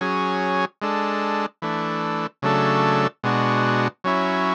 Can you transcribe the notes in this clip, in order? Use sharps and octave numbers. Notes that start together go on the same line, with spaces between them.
F#3 C#4 G#4
G#3 D4 A4
E3 A3 D4
C#3 F#3 A3 D4 A4
B2 G#3 D4 F#4
F#3 C#4 E4